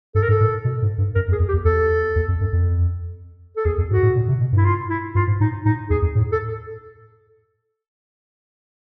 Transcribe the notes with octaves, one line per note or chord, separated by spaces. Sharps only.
G2 A4
A#4
G#2 A4
A2
B2
G#2
G2
F#2 A#4
F2
G#4
F2
G4
E2
E2 A4
E2
F2
F#2
F2
A4
E2 G#4
F2
G#2 F#4
A2
A#2
C3
B2
G2
E4
F4
E4
G2 F4
G#2
A2 D#4
A2 D#4
E2 G#4
F2
A2
A4